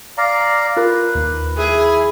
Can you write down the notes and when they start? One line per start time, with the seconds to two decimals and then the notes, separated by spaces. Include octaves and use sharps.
0.18 D5 F5 A#5
0.77 F4 A#4 B4
1.15 D#2
1.57 E4 G#4